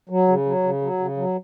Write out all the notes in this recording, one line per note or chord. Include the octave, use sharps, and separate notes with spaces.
F#3
C#3
F#3
C#3
F#3
C#3
F#3